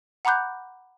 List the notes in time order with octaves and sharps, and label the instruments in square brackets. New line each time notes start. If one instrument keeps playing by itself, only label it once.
[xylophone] F#5 A#5 B5 D6 F#6 G6